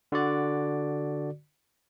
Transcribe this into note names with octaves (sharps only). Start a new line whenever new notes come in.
D3 F#4 D5